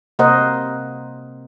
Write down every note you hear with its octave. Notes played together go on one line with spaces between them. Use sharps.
C3 A#3 A#4 C5 D#5 F#5